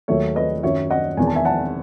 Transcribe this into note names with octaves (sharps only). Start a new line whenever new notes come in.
D#2 D#3 F#3 A3 C#5 E5
B4 D#5
F#2 D#3 F#3 C#5 E5
D#5 F#5
E1 E2 D#3 G#5
A5
E5 G#5
F#5 A5